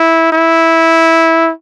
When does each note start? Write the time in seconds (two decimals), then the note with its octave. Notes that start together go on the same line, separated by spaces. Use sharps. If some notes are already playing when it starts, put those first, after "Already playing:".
Already playing: E4
0.32 E4